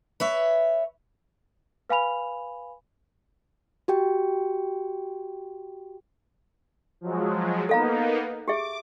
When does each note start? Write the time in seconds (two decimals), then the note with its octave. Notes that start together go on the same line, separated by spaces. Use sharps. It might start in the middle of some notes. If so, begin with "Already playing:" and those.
0.20 B4 C#5 E5
1.89 B4 F5 G#5 B5 F7
3.88 F#4 G4 G5
7.01 F3 F#3 G#3
7.69 A#3 B3 D#4 A4 F5 A#5
8.48 G4 G#4 E5 D6